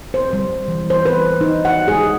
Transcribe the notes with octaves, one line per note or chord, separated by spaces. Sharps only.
C5
G3
E3
C5
B4
D#4
F#5
G#4